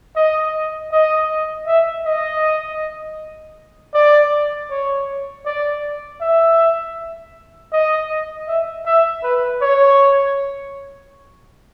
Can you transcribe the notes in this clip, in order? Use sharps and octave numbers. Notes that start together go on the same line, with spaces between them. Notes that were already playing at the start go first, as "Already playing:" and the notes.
D#5
D#5
E5
D#5
D5
C#5
D5
E5
D#5
E5
E5
B4
C#5